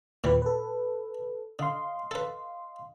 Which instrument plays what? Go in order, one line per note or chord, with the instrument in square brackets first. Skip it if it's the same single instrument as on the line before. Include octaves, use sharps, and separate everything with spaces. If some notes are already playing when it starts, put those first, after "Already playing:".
[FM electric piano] D#2 B4 [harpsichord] A#2 E3 G3
[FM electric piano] A4 B4
[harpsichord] D3 [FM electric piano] D#5 F5 C6
[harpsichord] A4 B4